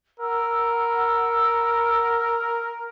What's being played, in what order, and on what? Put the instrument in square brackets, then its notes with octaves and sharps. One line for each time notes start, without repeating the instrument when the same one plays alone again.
[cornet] A#4 [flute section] F#5 B5 E6